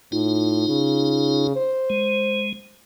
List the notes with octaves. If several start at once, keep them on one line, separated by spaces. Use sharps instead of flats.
A2 D#4 F4
C#3
C5
G#3